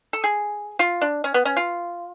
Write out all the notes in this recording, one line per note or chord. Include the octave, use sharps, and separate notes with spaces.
A4
G#4
F4
D4
C#4
B3
C#4
F4